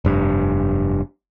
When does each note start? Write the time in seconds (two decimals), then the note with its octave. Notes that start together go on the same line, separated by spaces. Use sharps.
0.05 F1 G2